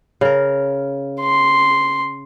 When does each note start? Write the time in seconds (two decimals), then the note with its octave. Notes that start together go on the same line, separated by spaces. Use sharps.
0.21 C#3 A#4
1.22 C6